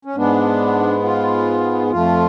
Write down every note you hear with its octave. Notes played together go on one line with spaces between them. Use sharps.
C#4
G#2 G#3 B3 D4
F4
F2 F3 A3 F4